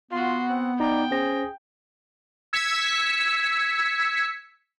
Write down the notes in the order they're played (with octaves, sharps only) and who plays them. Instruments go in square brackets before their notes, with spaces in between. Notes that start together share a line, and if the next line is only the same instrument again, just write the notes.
[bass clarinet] B3 [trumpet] F4 [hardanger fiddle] F#4 C6
[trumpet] C4 [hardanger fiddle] F#5
[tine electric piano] D#4 A#5 [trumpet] D5 [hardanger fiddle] G5
[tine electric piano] C#4 C5 A#6 [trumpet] G#4
[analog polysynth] E6 G#6 B6 C#7